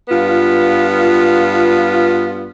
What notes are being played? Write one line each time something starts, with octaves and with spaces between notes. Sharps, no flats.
G2 B3 F4